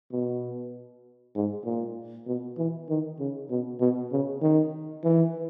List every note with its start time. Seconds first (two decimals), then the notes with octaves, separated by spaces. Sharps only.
0.12 B2
1.35 G#2
1.65 A#2
2.27 B2
2.58 E3
2.89 D#3
3.19 C#3
3.50 B2
3.80 B2
4.12 C#3
4.42 D#3
5.04 E3